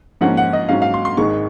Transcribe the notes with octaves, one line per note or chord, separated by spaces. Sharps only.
G#2 F3 A#3 C#4 F#5
F#5
D#5
G#2 F#3 C#4 F5
F5
C6
C6
G#1 G#2 D#3 G#3 C#6